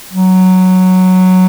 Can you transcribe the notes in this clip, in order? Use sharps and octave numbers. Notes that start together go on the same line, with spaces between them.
F#3